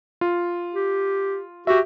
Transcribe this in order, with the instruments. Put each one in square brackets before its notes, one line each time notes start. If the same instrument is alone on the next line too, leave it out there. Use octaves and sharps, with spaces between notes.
[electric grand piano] F4
[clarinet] G4
[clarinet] F#4 [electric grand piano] G4 E5